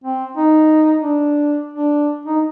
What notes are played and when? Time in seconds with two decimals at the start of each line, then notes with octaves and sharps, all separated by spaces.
0.04 C4
0.37 D#4
1.02 D4
1.74 D4
2.26 D#4